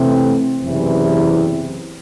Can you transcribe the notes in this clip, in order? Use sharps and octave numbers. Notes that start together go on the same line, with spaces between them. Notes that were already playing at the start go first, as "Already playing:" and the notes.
Already playing: C3 E3 A3 C4
F#1 E2 C3 E3